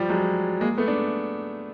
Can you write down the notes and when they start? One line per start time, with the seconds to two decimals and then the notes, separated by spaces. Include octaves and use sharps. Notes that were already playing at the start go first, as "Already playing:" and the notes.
Already playing: F3 G3
0.09 F#3 G#3
0.61 G#3 A#3
0.78 A3 B3
0.88 D4